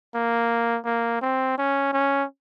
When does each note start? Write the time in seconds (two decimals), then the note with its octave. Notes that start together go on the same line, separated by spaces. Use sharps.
0.14 A#3
0.85 A#3
1.21 C4
1.58 C#4
1.92 C#4